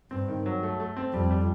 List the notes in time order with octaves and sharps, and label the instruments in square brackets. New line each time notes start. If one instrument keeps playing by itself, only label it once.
[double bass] G2 [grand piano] C4
[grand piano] D#3
F#3
A3
A3
C4
[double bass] F2 [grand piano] G3
[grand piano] G3